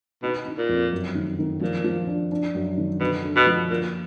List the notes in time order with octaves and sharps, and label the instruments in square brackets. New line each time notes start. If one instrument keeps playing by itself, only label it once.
[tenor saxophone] B2 [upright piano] D#4
[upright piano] D#4
[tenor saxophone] A#2
[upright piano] F2
F#2
D#3
D#3
[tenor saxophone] A#2 [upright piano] F3
[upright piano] F3
D4
D4
F#2
D#3
[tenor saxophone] B2 [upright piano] D3
[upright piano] D3
[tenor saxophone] B2
[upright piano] F3
[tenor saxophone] A#2 [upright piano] A#3